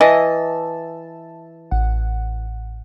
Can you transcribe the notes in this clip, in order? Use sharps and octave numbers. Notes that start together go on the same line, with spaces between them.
E3 D#5 E5 A5
A1 F#5